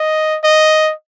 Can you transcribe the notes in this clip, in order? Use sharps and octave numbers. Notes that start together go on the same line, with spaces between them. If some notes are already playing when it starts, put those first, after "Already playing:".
Already playing: D#5
D#5